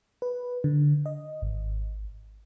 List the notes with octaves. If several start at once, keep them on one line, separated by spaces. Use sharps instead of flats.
B4
D3
D#5
G#1